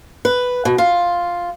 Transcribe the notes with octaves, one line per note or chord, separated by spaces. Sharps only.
B4
B2
F4